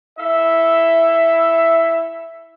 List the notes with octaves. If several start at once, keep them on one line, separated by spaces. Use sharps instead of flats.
E4 A4 E5